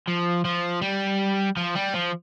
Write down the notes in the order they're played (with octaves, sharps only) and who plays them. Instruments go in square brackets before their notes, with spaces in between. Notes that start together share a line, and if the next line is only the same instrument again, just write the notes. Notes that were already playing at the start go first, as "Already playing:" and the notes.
[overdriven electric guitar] F3
F3
G3
F3
G3
F3